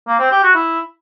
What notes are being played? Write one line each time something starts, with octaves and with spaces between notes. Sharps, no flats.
A#3
C4
G4
F#4
E4